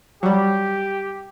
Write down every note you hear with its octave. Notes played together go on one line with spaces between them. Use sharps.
F#3 G3 G4